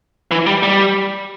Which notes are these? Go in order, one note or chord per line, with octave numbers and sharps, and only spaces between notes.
E3
G3
G3